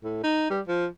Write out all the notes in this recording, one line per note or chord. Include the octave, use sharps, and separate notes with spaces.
A2
D#4
G3
F3